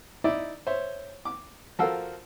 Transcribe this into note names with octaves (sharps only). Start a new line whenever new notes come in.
D#4 E4 D5 E5
C5 C#5 E5
D6
F3 F#4 A4 A#4 F5 E6